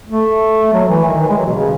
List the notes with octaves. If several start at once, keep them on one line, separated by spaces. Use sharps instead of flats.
A3
F#3
E3
D#3
E3
G#3
F#3
B2
C#3